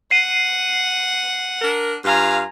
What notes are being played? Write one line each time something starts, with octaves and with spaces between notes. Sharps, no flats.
F#5 C7 D#7
D4 A#4
G2 F4 F5 G#5 A#5